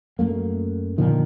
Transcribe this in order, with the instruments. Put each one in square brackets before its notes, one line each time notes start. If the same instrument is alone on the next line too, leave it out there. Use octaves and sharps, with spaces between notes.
[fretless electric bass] F#2 A3 A#3
A#2 D3 D#3 F3